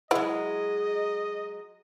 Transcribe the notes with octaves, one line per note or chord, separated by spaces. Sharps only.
F#3 G#3 E4 D#5 F#5